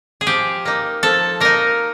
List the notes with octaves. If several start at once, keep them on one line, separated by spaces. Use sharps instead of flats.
G#4
F3 G4
A#3 D#4
F3 A4
A#3 D#4 A#4